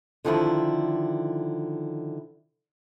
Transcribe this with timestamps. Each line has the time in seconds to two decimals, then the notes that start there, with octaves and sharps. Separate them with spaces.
0.25 D3 D#3 F3 E4